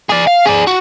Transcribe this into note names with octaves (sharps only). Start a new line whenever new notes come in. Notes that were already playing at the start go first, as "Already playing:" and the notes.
G#4 D5
F5
G#4 D5
F#4